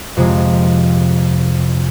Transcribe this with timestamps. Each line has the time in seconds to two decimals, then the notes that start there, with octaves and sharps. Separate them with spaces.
0.17 F2 C3 G#3